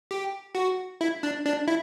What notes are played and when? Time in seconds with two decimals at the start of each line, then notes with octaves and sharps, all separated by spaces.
0.11 G4
0.55 F#4
1.01 E4
1.23 D4
1.46 D4
1.67 E4